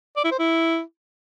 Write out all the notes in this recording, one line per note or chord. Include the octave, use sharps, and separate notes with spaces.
D5
E4
C5
E4